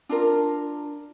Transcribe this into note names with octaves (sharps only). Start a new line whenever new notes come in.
D4 F4 A#4